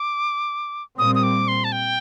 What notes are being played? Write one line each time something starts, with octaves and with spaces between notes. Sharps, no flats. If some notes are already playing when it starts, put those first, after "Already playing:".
Already playing: D6
A#2 G3 C4 D#6
D#6
D6
C6
A5
G5